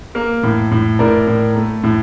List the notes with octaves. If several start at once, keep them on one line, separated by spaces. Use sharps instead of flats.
A#3
A2
A2
A2 A#4 D5
A2
A3
A2